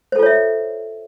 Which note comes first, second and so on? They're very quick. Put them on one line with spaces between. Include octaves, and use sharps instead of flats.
C5 A4 F4 C#5 E5